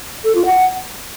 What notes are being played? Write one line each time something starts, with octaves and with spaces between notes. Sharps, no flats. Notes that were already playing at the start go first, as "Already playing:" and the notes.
A4
F4
F#5